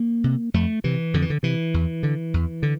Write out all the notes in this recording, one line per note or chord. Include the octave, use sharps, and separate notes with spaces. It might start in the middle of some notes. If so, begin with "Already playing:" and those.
Already playing: A#3
C3
F2 A3
C3 E3
F2 D3
E3
D3
C3 E3
E2
D3
E2
D3